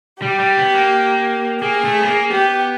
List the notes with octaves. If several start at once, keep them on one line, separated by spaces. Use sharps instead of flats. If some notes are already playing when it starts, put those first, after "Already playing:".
G3 G4
G3
B3
A#3
A#3 G#4
A3
B3
A#3
B3 G4